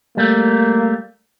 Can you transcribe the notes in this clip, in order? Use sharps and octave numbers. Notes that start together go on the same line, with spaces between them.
G3 A3 A#3